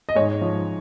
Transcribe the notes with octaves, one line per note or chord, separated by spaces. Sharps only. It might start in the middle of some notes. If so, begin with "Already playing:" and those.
D#5
G#2 C#5
F3